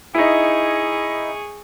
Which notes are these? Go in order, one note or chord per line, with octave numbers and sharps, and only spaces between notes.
D#4 E4 G#4 C#6